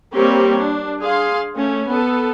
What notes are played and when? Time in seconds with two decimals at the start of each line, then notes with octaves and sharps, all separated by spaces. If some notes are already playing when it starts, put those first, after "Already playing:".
0.14 G3 A#3 C4 G4 C#5
0.58 D4
1.00 G#4 F5 C6
1.56 A3 C#4
1.89 B3 A4